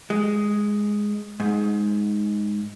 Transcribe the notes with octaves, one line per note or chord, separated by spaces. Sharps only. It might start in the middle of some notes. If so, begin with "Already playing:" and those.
G#3
G#2